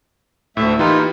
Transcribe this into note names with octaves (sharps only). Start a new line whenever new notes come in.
D2 A2 A3 E5
E3 A#3 D#4 F4 G4 B4